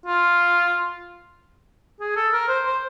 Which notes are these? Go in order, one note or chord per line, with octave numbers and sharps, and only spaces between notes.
F4
G#4
A4
A#4
C5
C5